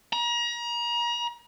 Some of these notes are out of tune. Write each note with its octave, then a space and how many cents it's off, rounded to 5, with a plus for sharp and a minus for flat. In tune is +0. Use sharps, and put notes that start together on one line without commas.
A#5 +35